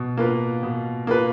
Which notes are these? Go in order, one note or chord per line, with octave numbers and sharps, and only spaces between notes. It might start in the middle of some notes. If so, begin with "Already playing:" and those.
Already playing: B2
A#3 F4 B4
B2
A#3 F4 B4